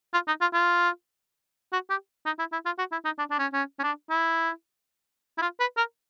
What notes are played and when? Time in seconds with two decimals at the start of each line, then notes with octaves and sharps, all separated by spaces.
0.14 F4
0.28 D#4
0.41 F4
0.53 F4
1.73 F#4
1.90 G4
2.26 D#4
2.39 E4
2.53 E4
2.66 F4
2.79 F#4
2.92 E4
3.05 D#4
3.18 D4
3.31 D4
3.39 C#4
3.53 C#4
3.79 C#4
3.83 D4
4.10 E4
5.38 E4
5.42 F4
5.60 B4
5.77 A#4